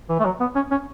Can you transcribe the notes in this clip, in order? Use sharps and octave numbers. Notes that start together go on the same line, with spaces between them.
E3
A3
F#3
B3
C#4
C#4